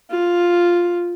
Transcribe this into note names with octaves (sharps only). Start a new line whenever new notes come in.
F4